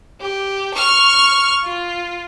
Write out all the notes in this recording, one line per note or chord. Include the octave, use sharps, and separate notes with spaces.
G4
C#6 F6
F4